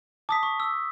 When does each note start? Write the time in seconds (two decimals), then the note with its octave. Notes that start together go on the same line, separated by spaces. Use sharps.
0.29 A5 D6 D#6 B6
0.43 C#6
0.60 E6